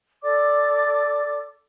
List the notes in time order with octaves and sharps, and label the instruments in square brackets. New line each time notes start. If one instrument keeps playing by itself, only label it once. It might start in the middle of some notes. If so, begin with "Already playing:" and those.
[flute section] A4 D5 D6